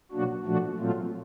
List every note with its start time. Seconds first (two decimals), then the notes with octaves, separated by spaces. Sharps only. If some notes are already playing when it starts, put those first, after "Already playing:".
0.12 B2 F#3 A#3 D4 F#4
0.45 A#2 F3 A3 D4 F#4
0.79 A#2 F#3 A3 C4 F4